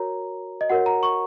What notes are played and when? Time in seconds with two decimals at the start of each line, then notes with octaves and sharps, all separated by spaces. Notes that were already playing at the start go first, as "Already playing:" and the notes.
Already playing: F#4 A#4 C#5 A#5
0.61 D#5
0.70 F#4 A#4 C#5 F#5
0.86 A#5
1.03 C#6